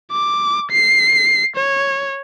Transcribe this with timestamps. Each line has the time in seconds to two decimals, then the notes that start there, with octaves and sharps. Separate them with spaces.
0.12 D6
0.71 C7
1.56 C#5